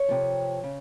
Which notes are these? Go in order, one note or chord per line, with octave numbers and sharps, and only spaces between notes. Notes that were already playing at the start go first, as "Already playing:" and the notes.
Already playing: C#5
F2 C3 F3
C#3